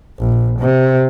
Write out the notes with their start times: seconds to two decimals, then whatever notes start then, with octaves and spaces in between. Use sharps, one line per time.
0.19 A#1
0.60 C3